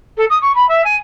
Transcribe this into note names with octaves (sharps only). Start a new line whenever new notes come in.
A4
D#6
C#6
B5
E5
G#5